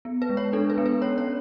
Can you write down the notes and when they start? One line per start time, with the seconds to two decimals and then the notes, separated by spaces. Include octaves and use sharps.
0.05 B3
0.22 B4
0.30 G#3
0.37 C#5
0.53 D4 A4
0.70 B4
0.78 B3
0.86 B4
1.01 C#4 C#5
1.18 C#5